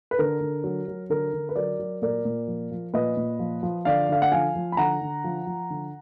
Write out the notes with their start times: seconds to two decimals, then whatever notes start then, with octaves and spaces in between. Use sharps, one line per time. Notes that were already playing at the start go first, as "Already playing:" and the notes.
0.11 B4
0.19 D3 A#4
0.41 D3
0.64 F#3
0.88 F#3
1.10 D3 A#4
1.33 D3
1.49 B4
1.56 F#3 A#4 D5
1.79 F#3
2.02 A#2 A#4 D5
2.25 A#2
2.48 F3
2.71 F3
2.94 A#2 B4 D#5
3.17 A#2
3.39 F3
3.63 F3
3.85 D3 D5 F5
4.09 D3 F5
4.22 F#5
4.32 F3 F5 G#5
4.56 F3
4.72 B5
4.77 D3 F#5 A#5
5.01 D3
5.24 F3
5.47 F3
5.70 D3